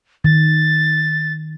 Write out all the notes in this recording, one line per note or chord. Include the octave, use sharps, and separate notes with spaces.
D#3 A6